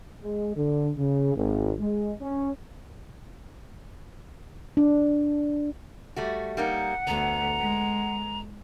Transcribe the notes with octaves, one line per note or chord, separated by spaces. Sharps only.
G#3
D3
C#3
G#1
G#3
C#4
D4
G3 A3 F#4
G3 A#3 D#4 F#5
D2 B3 A4 A#5
G#3